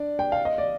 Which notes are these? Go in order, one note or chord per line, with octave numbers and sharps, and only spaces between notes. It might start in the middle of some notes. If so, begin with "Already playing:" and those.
Already playing: D4 D5
G5
F5
D#5
D5